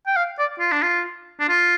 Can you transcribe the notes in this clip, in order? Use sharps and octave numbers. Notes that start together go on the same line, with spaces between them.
G5
F5
D5
F4
D4
F4
D4
F4